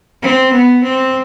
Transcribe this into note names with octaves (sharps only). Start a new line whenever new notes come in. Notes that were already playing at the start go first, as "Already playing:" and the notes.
C4
B3
C4